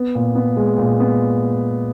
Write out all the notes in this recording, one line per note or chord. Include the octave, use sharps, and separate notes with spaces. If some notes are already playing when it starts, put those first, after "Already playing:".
Already playing: B3
A#2
B3
G#3
A#2
B3